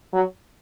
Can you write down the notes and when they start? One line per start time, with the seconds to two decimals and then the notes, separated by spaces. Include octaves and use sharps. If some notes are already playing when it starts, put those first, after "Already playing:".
0.13 F#3